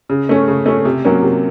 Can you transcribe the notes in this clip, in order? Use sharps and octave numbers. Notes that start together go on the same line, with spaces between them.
C#3
A3 C#4
C#3
A3 C#4
C3
F#3 A#3 C#4
C3